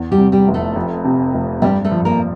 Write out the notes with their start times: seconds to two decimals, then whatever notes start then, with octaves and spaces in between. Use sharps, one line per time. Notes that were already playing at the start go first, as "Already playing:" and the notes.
Already playing: E2
0.12 G3 G4
0.18 C3
0.32 G3 G4
0.48 F1
0.54 A3 A4
0.76 F2
1.04 C3
1.34 F1
1.62 G2 G3 G4
1.84 A3 A4
1.91 F3
2.05 A#3 A#4